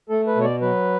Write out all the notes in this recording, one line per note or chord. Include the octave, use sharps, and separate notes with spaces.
A3 A4
B4
B2 C#5
D5
F#3 B4